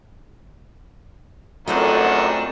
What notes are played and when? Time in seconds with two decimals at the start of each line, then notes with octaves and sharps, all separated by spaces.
1.68 G#1 F#2 A3 C4 D4 D#4 F4 F#5